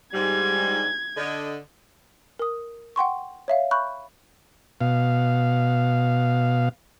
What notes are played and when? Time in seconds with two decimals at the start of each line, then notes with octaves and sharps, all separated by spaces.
0.14 G#2 G3 G#6
1.17 D3 D#5
2.39 A#4 D#6
2.96 F#5 G5 C6 C#6
3.48 C#5 E5 F5
3.71 B5 C#6 F#6 G6
4.81 B2 F5